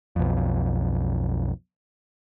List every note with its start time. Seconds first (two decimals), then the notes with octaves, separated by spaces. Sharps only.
0.16 B1 F2